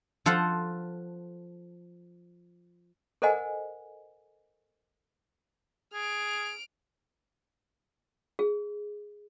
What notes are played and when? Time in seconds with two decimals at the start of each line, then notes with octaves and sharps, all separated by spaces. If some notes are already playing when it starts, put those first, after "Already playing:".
0.26 F3 A4 C5 F5 F#5
3.22 A4 A#4 C5 D#5 F#5 G#5
5.94 G#4 F6 D7
8.39 G#4